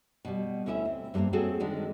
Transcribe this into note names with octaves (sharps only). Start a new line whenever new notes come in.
B2 G3
D2 C#4 E4 D5 E5
C4
G2 G3 G#3 A#3 C4
C4 C#4 F#4 G#4 A4
D3 D#3 G#3 D4